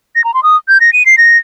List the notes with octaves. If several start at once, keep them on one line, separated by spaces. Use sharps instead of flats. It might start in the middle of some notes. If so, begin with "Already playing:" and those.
A#6
A#5
C6
D#6
G6
A#6
D#7
C7
A#6